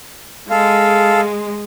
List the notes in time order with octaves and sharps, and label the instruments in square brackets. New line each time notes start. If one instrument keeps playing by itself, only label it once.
[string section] G#3 [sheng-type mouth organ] A4 F5